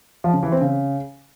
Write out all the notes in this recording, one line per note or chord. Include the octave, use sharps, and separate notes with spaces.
F3
C#3
E3
C4
C#3